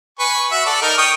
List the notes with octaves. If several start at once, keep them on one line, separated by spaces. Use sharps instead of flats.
B4 G#5 C#6
F#4 E5
A4 D5
D#4 A#4
G5 C#6 D#6